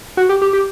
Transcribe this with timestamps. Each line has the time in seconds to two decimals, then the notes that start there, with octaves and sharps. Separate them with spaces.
0.17 F#4
0.29 G4
0.42 G4
0.53 G4